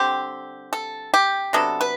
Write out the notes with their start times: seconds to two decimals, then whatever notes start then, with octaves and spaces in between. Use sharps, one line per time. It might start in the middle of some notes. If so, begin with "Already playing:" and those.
Already playing: D3 G3 C4 G4
0.73 A4
1.14 G4
1.53 C3 F#3 B3 D4 A4
1.81 B4